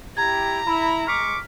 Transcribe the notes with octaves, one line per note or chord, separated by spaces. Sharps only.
E4 G4 A#5 G#6
E4 B5
G#3 C#6 D6 F6 B6